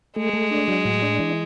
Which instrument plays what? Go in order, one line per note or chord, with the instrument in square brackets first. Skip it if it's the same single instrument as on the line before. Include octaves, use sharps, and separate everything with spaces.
[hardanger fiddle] G#3 [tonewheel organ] A3
[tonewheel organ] A3
D4
F#3
A2
D4
E3